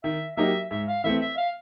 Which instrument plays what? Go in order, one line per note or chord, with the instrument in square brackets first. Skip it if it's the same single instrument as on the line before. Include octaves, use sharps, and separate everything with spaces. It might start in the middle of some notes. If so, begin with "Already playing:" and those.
[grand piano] D#3 [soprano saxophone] E5
[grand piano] F#3 A#3 D#4 G4 [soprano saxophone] E5
[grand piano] G#2 [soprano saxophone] E5
[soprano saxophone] F5
[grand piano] E3 A3 C4 [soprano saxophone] E5
[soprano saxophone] E5
F5